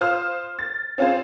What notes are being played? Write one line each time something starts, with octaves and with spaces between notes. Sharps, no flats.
F4 C5 D#6 F6
A6
C4 C#4 F4 G#4 C5